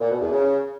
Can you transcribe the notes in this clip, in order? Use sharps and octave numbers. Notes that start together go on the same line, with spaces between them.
A#2
B2
E2
C#3